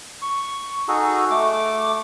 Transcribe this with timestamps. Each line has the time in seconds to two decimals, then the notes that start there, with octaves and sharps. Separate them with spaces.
0.22 C#6
0.88 D#4 F#4 G#4 A4
1.30 A3 D6